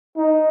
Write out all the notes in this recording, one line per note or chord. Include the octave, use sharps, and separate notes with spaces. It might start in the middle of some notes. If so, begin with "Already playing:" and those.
D#4